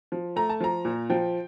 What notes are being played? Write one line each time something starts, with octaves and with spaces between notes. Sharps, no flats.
F3
A3 A#5
A5
F3 A#5
A#2
F3 G5